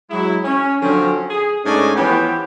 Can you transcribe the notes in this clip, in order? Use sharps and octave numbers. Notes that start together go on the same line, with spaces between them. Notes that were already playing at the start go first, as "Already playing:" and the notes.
F#3 G#3 E4
C#4
D3 F3 F#3 C4 C#4
G#4
G#2 A3 C#4 D4 D#5 G#5
E3 F3 B3 C#4 G4